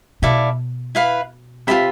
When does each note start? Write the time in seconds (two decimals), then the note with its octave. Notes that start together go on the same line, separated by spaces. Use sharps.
0.22 B2 E4 A4 D5 F5
0.95 E4 B4 F5 B5
1.67 C3 F4 A4 E5 B5